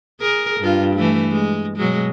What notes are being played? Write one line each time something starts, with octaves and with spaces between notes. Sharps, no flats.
G#4 A#4
G2 F4
E3 A3
G#3
B2 F#3 G#3